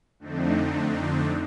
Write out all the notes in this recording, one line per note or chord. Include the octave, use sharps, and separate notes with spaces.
F2 D3 A3 C4 D4 D#4